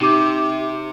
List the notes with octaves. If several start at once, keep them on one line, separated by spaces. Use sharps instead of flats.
C3 D#4 G4 D6